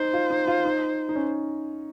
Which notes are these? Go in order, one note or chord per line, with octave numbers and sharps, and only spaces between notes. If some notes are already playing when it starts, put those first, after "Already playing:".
Already playing: D#4 C5
F4
D#4
F4
D#4
D#4
C#4